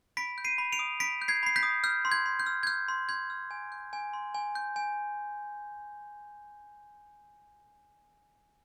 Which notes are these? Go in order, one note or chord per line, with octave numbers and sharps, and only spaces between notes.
B5 B6 D7
G6
C7 D#7
B5
D7 F7
D#6
B5 B6 D7
G6
G#6 C7
B5 C7
G6 B6
D#6
F6 G6
C6
G#6
C6
G6
F6
G#6
F6 G6
C6
C6 G#6
F6
G#5
G6
G#5
C6
G#5
G6
G#5